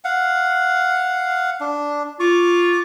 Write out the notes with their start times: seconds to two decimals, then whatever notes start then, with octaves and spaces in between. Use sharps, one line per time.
0.04 F5 F#5
1.60 D4
2.20 F4 C#6 D6